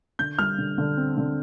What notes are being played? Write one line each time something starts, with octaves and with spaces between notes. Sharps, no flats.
D3 G6
G3 F6
D3
D3
C4
D3